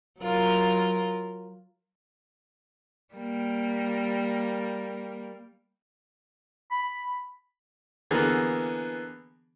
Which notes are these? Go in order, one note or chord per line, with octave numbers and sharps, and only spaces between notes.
F#3 F4 A#4
G3 A#3
B5
D3 E3 A#3 B3 G#4